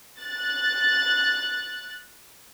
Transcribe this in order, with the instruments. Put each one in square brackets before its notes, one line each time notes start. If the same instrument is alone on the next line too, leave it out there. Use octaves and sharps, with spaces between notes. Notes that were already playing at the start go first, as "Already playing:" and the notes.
[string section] F#6 A6